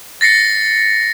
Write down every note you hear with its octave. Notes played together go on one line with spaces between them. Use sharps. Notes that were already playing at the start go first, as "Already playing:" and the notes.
A6 A#6 C7 C#7